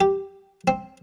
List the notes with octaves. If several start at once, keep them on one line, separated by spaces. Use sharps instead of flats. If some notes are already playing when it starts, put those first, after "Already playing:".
G4
C4